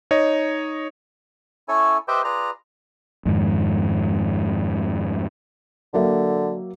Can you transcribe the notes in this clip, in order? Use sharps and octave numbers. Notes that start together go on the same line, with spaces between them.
D#4 C#5 D#5
C#4 E4 A4 C#5 G#5
G4 B4 C5 D#5 E5 G5
F4 G#4 B4 D5 A#5
F2 G#2 D#3
D3 F#3 A#3 E5